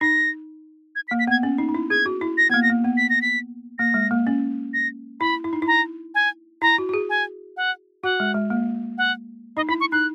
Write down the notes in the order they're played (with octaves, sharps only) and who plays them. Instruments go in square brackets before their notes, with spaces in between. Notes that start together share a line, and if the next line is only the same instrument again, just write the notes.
[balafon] D#4 [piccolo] A#6
[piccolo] G#6
B6
[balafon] A#3
[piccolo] B6
[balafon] B3 [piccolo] G#6
[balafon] C#4
D#4
D#4
E4
[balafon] G#4 [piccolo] G#6
[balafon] F#4
E4
[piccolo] A#6
[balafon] A#3 B3 [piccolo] G#6
[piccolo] A#6
[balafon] A#3
B3
[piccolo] B6
A#6
B6
[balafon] A#3 [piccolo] A#6
[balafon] G#3
A#3
C#4
[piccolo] A#6
[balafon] E4 [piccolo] B5
[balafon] E4
D#4
E4
[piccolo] A#5
G#5
[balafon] E4 [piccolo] A#5
[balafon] F#4
F#4
G#4
[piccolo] G#5
F#5
[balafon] F#4 [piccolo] F#5
[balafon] G#3
G#3
A#3
[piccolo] F#5
[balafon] D#4 [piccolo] D#5
[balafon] E4 [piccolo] B5
[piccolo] C#6
[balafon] D#4 [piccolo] F#6